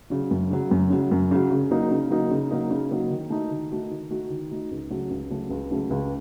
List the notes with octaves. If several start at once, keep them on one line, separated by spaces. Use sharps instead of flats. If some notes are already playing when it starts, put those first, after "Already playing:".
C#3 F#3
F#2
C#3 F#3
F#2
C#3 F#3
F#2
C#3 F#3
C#3
F#3 A#3 D#4
C#3
F#3 A#3 D#4
C#3
F#3 A#3 D#4
C#3
F#3 A#3 D#4
D#3
A3 D#4 F#4
D#3
A3 D#4 F#4
D#3
A3 D#4 F#4
D#3
A3 D#4 F#4
C#2
C#3 F#3 A3
C#2
C#3 F#3 A3
C#2
C#3 F#3 A3
C#2